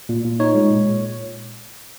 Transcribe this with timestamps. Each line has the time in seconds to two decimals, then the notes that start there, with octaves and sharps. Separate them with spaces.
0.09 A#2
0.24 A#2
0.40 D#4 C#5
0.55 G#3
0.70 A#2
0.85 A#2